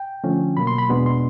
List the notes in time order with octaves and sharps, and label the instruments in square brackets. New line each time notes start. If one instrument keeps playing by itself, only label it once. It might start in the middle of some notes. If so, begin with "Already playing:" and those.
Already playing: [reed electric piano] G5
D3 F3 A3 C#4
B2 F#3 A#3 B5
C6
B5
E2 B2 G#3 B3 D4
C6